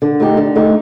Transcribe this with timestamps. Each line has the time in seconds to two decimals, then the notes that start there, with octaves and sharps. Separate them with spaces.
0.02 D3
0.20 A3 D#4 G4
0.37 D3
0.56 A3 D#4 G4